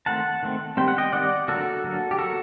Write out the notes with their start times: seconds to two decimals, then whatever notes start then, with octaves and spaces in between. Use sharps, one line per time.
0.06 D#3 A3 C4 F#5 A5
0.43 D#3 A3 C4
0.77 D#3 G3 C4 G5
0.88 F#5
0.98 D#5 G5
1.12 D#3 G3 C4 D5 F#5
1.48 D3 F#3 A#3 F#4 A4
1.84 D3 F#3 A#3
2.11 G4
2.18 F#3 A#3 F#4 A4